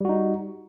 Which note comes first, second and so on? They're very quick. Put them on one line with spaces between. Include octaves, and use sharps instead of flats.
G3 F#4 D#4